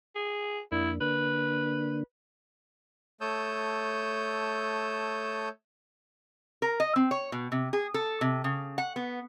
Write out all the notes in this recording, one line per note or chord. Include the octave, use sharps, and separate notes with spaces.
G#4
F2 A#3 D4 E4
D3 A#3 D4 B4
A3 C#5 A5 D#6 E6 G6
A#4
D#5
C4
C#5
B2
C3
G#4
A4
C3
C#3
F#5
B3